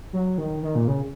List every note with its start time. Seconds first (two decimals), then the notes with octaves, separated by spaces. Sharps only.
0.13 F#3
0.38 D#3
0.63 D#3
0.75 A#2
0.88 C#3